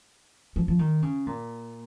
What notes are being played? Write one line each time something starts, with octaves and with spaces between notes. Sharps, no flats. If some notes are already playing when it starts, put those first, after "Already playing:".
F3
F3
D#3
C#3
A#2